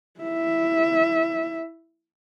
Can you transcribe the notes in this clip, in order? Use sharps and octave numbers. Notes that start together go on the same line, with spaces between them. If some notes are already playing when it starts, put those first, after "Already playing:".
E4 E5